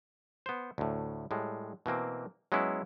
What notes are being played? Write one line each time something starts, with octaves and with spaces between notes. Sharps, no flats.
B3 C5
D2 A2
A2 G3 G#3
B2 E3 A#3 C4
F#3 G#3 B3 C#4 E4